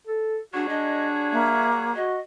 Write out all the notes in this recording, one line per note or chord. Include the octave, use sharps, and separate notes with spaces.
A4
F#3 G3 D4 F#4 G#4
D4 D#5
A#3 E5
F#4 D#5